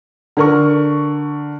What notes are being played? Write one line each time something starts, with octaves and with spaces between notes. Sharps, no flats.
D3 A#4 C#6